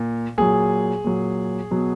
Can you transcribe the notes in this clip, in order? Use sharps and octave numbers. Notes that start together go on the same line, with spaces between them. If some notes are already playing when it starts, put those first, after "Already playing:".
Already playing: A#2
A#2 F#3 G#4
A#2 F#3
B2 F#3